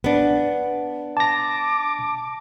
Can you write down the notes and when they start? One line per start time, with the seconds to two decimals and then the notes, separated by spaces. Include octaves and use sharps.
0.04 B3 D4
1.17 A5 D6 A#6